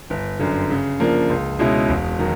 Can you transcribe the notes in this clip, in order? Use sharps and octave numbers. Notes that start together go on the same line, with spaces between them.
G1
F#2 D3
C#3
F3 A#3 D4
C#2
B2 G#3 C#4 E4
E1
D#3 F#3